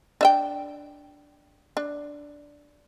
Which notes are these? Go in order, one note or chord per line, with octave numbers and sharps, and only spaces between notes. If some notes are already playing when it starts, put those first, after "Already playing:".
D4 E5 G5
D4